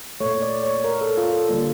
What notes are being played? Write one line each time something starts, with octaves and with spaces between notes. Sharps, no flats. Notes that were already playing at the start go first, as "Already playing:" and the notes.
A#2 A3 C#5
D5
C#5
A#4
A4
F4
A4
D3 G3 A#3 F4